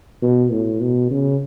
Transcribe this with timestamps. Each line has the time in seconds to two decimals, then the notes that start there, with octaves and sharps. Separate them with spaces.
0.22 B2
0.51 A2
0.80 B2
1.11 C#3